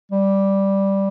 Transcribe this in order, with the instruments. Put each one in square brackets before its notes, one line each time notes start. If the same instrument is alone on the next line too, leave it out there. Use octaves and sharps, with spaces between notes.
[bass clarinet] G3